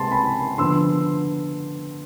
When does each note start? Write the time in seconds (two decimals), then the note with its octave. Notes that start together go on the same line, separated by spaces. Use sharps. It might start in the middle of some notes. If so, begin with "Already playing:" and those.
Already playing: C3 G#3 C4 A5 C6
0.12 G#5 B5
0.58 D3 F3 B3 C6 E6